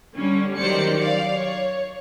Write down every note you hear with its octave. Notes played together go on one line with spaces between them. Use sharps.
D3 G3 C#4
D#3 F#3 G4 C5 D5 C#7
D5 F5
C#5